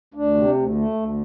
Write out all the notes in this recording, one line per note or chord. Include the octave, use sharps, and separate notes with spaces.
D2 D4
C3
D2
A3
D2